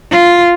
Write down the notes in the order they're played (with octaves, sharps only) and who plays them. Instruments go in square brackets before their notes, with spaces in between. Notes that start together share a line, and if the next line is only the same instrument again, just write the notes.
[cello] F4